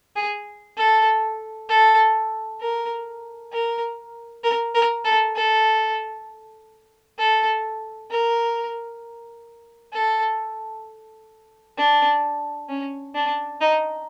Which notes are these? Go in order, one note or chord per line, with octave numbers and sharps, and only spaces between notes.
G#4
A4
A4
A#4
A#4
A#4
A#4
A4
A4
A4
A#4
A4
D4
C#4
D4
D#4